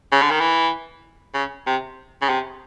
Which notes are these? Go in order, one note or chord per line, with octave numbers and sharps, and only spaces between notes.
C#3
D3
D#3
E3
C#3
C3
C#3
C3